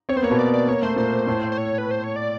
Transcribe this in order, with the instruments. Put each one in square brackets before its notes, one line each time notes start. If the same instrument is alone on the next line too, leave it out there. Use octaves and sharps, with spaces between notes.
[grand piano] C4 [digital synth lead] C#5
[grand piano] B3 [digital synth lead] C5
[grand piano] A#3 [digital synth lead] C#5
[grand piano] B2 B3
[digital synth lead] D5
D5
[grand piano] A#3 [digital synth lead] C#5
[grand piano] A3 [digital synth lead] C5
[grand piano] A#2 A#3 [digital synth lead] C5
[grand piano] A2 A3
[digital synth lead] C5
C#5
B4
C5
C#5
D5